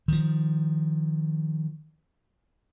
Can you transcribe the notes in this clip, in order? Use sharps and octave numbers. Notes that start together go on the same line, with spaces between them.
D#3 F3